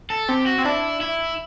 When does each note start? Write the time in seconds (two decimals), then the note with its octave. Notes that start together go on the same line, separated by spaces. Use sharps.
0.10 A4
0.29 C4 G4
0.46 F#4
0.58 C4
0.64 D4 E4
1.01 E4